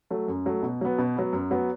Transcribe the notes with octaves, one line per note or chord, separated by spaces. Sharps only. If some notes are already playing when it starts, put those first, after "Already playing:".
F#3 A3
F#2
F#3 A3
B2
F#3 B3
B2
F#3 B3
F#2
F#3 B3